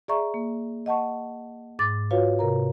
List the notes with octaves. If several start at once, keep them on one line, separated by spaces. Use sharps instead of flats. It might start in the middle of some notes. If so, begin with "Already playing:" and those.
G#4 D5 E5 A#5 C#6
A#3
D#5 F#5 A5 C#6
G#2 D6 A6
F4 F#4 B4 C#5 F5
C3 A#4 A#5